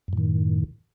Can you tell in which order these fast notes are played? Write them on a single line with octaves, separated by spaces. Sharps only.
F#2 A2 D#3